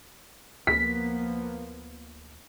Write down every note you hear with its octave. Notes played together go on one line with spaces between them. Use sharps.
D2 F3 A#3 B3 B6